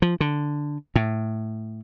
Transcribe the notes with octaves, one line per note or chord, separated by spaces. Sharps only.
F3
D3
A2